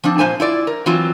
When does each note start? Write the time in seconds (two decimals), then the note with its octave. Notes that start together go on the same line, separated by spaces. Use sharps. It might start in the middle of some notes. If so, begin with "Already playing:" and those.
0.04 F3 C4 D4
0.18 A#2 G#3 B3 C5 G#5 A5
0.40 E4 F4 D5
0.67 A#4
0.86 E3 F#3 C4 F4